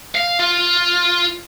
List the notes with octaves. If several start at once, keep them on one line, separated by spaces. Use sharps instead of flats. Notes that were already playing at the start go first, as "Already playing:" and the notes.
F5
F4